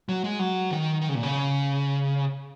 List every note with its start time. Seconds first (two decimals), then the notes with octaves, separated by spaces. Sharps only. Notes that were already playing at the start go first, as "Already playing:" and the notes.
0.09 F#3
0.24 G#3
0.39 F#3
0.71 D#3
1.01 D#3
1.09 C#3
1.15 A#2
1.23 C#3